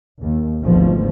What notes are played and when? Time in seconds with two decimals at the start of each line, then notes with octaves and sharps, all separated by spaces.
0.22 D#2
0.63 G#1 D2 B2 F3